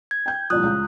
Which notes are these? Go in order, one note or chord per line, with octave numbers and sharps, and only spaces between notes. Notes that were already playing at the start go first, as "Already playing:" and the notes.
G#6
G5 G6
C2 A#2 F3 D#6 F#6
C#2